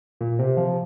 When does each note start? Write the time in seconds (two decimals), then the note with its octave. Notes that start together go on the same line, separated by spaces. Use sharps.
0.21 A#2
0.39 C3
0.57 F3